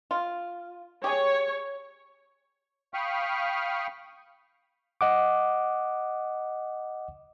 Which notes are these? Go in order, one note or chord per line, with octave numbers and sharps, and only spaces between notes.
F4
G4 G#4 C#5
F5 G5 B5 C#6 D#6 F6
D#5 F#5 D6